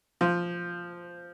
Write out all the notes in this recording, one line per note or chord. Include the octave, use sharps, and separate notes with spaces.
F3